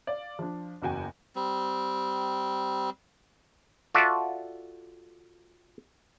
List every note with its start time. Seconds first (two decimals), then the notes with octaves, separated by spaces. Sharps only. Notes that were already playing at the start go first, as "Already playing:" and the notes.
0.07 D5 F5
0.39 F3 D4
0.82 F#1 E2 F#4 G5 G#5
1.36 G3 C4
3.95 F4 F#4 A4 D5 E5